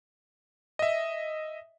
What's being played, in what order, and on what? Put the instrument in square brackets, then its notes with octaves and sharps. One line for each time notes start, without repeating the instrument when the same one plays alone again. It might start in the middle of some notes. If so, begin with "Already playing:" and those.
[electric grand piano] D#5 E5